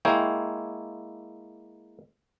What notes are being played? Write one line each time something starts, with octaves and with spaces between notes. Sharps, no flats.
G#3 A#3 E4 C#5 G5